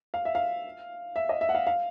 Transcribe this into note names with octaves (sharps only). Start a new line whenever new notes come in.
F5
E5
F5
E5
D#5
E5
F#5
F5
F5